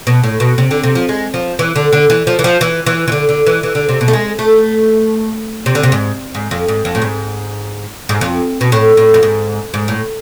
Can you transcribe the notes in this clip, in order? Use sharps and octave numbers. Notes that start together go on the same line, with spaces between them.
B2
A2
B2
C3
D3
C3
F3
G#3
F3
E3
D3
D3
E3
F3
E3
F3
E3
E3
E3
D3
D3
E3
E3
D3
C3
B2
A3
G#3
A3
C3
D3
C3
G#2
G#2
F2
G#2
F2
A2
G#2
G#2
F2
B2
A2
A2
F2
G#2
G#2
A2